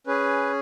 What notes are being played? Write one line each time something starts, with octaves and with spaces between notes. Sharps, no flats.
C#4 G#4 B4